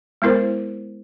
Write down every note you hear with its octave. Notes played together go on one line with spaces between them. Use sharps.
G#3 B3 E4 A#4 C5